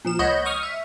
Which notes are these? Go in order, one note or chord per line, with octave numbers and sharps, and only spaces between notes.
A#2 F3 E7
C#2 C#5 D#5 F#5 B5 G6
C#6 D#6 F6
E5